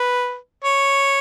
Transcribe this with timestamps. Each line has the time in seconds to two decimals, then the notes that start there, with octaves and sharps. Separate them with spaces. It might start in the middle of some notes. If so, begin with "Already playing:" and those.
Already playing: B4
0.64 C#5